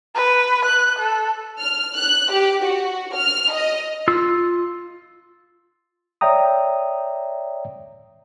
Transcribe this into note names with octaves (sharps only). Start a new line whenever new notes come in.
B4
F#6
A4
F6
F#6
G4
F#4
F6
D#5
F4 E6
C#5 D5 E5 G5 A#5 D#6